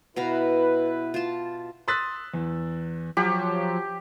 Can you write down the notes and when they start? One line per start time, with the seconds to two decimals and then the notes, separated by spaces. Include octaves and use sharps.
0.16 B2 E4 B4 F5 A#5
1.14 F4 A5
1.88 C6 D#6 E6 F#6 A6 B6
2.34 E2
3.17 F3 F#3 G4